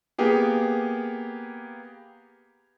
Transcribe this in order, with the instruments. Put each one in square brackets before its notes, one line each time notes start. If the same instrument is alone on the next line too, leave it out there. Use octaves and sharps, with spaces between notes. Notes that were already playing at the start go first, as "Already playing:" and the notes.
[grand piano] A#3 B3 G4 G#4